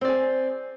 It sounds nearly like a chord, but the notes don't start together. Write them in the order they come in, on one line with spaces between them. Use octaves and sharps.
C4 D5 G#4